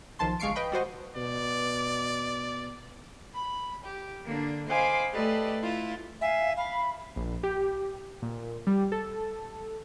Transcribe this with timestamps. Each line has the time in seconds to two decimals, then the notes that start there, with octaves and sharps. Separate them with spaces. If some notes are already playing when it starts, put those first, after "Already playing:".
0.19 B1 D#3 F3 A5 C6
0.40 G1 G#3 F5 C#6 C7 D7
0.56 B4 D#5 G5 B5
0.72 G3 F#4 C5 D#5
1.16 B2 D5
3.34 B5
3.85 G4
4.24 D3 A#3 D4
4.68 C5 D#5 F5 G#5 B5 D6
5.13 A3 G4 A4 B4 D5 D#5
5.62 E4 F4
6.21 E5 F5 G#5
6.57 F5 B5
7.16 A#1
7.43 G4
8.22 A#2
8.67 G3
8.92 A4